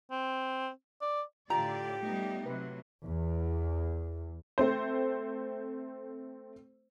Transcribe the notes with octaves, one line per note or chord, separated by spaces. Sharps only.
C4
D5
A2 D3 F4 G4 D5 A#5
G3 A3 B3 D#4
C3 F#3 B4
E2
A3 C4 C5